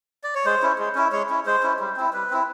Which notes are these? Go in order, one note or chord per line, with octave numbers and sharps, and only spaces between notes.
D5
C#5
G#3 C5
C#4 E4
G#3
C#4 E4
G#3 C#5
C#4 E4
G#3 C5
C#4 E4
G3
C4 E4
G3 B4
C4 E4